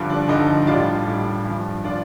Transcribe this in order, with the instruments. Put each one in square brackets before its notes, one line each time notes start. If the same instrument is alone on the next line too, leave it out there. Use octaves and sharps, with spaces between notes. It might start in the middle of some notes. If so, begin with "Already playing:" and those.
Already playing: [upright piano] G2 D3 F3
D4
G2 D3 F3 D#4
A2 G3 D4 F4
A2 G3
G2 F3
F3 D4 F4